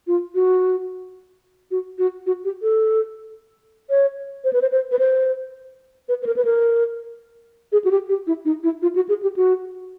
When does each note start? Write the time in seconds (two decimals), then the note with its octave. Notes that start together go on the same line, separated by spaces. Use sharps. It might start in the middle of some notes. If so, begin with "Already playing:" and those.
0.07 F4
0.35 F#4
1.71 F#4
1.98 F#4
2.26 F#4
2.44 G4
2.62 A4
3.90 C#5
4.44 C5
4.53 B4
4.62 C5
4.72 C5
4.92 B4
4.99 C5
6.09 B4
6.22 B4
6.26 A#4
6.36 B4
6.45 A#4
7.72 G#4
7.84 F#4
7.91 G4
8.09 G4
8.27 E4
8.45 D#4
8.63 E4
8.82 F4
8.96 F#4
9.09 G#4
9.23 G4
9.36 F#4